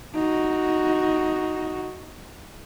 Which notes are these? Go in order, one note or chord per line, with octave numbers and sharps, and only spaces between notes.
D#4 F#4